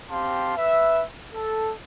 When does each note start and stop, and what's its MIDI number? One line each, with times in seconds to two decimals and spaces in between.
0.10 0.56 60
0.10 0.56 67
0.10 0.56 77
0.10 0.56 81
0.10 0.56 84
0.57 1.03 71
0.57 1.03 76
1.33 1.71 69